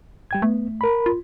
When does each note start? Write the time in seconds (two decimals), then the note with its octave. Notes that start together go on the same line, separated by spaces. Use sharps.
0.31 G3 G5 G#6
0.42 A3 B3
0.81 A#4 B5
1.06 F4